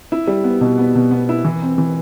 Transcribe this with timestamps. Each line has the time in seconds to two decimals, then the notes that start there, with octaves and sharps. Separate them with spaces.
0.12 E4
0.27 G3
0.44 B3
0.61 B2
0.78 B3
0.95 B2
1.11 B3
1.29 E4
1.44 E3
1.62 C4
1.78 E3